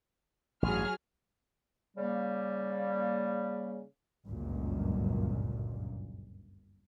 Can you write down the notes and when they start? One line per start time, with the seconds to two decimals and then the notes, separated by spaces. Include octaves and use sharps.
0.63 A1 G2 F#3 G#4 F6
1.97 C#3 G3 A#3
4.27 G1 C#2 F#2 A#2